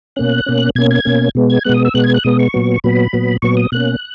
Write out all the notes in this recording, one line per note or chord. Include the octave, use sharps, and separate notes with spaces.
B2 A#3 C#4 F#6
B2 A#3 C#4
B2 A#3 C#4 G#6
G#6
B2 A#3 C#4
B2 G#3 B3
G#6
B2 G#3 B3 F#6
D#6
E6
B2 G#3 B3 F#6
G#6
F#6
B2 G#3 B3 D#6
C#6
A#2 F#3 B3
A#2 F#3 B3 B5
A#2 F#3 B3
A#2 F#3 B3 C#6
D#6
B2 A#3 C#4 F#6